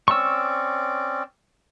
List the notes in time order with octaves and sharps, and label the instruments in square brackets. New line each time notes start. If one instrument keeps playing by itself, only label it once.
[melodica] C4 C#4 D5 [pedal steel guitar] C#6 E6